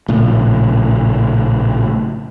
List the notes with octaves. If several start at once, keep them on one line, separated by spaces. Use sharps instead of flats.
A#1 A2 C#3